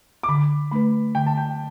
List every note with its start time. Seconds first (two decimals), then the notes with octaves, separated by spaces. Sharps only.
0.23 D6
0.29 D3 B5
0.71 A3 D4 B4 B5
1.15 D3 G5
1.26 A5
1.37 G5